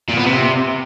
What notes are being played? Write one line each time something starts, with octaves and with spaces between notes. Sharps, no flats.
A#2
B3
C3